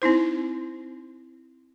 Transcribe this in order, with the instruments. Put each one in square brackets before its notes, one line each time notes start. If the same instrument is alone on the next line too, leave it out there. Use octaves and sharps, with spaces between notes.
[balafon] C4 D#4 E4 C5